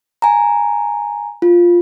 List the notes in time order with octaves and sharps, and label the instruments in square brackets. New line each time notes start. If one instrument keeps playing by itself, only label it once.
[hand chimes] G#5 A#5
F4